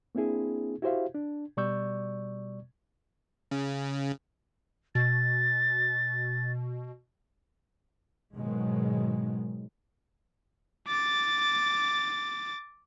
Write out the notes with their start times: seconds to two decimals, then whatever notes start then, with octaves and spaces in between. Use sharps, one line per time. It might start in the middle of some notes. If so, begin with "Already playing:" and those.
0.15 A#3 C4 D4 E4 G#4
0.82 E4 F#4 G4 C5 E5 F5
1.15 D4
1.57 B2 G3 D5 C#6 E6 G6
3.51 C#3
4.95 B2 A6
8.34 G#2 B2 D#3 F#3 G#3
10.88 D6 A6